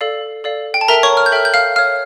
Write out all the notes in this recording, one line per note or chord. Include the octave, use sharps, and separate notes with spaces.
A4 D5 F5
A4 D5 F5
G5
A5
A4 A#4 E5 G5 A#5
C#5 C#6
F6
G6
A4 E5 G5 F6
G6
F5 F6
C#5 F5 F6